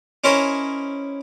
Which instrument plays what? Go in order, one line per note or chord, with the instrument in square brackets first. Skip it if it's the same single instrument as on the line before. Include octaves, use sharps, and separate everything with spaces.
[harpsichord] C#4 E4 A#4 C5 C#5 D#5